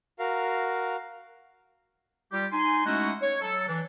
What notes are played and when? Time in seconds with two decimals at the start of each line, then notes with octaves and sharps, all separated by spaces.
0.19 F#4 A#4 F5
2.32 G3 F4 G4
2.52 D#4 G#5 C6
2.86 G#3 A3 C#4 D#4 E4 F#4
3.22 C#5
3.42 F#3 A4
3.68 E3 D4